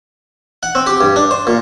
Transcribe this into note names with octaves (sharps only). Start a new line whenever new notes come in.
F#5
C4
G4
G2
D4
C5
A#2